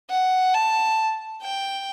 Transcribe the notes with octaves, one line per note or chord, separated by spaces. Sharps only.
F#5
A5
G5